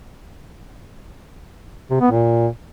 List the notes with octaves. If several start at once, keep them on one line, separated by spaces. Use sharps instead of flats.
C3
B3
A#2